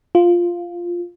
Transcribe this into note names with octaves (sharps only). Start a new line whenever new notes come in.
F4